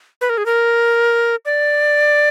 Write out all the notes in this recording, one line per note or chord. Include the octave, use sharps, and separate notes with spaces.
B4
A#4
G#4
A#4
D5